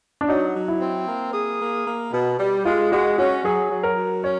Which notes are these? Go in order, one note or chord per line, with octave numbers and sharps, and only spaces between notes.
D4
F#3 D#4
F#3
E4
C4
A#3
G#4
A#3
A#3
B2
G3
G#3 F4
G#3 F#4
C#4 F#4
F#3 G#4
F#3
A#4
F#3
C#4 C#5